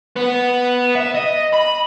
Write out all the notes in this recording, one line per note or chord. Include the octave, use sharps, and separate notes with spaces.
B3
E5
D#5
B5